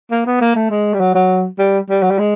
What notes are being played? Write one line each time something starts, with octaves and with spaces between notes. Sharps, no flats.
A#3
B3
A#3
A3
G#3
G3
F#3
F#3
G3
G3
F#3
G3
G#3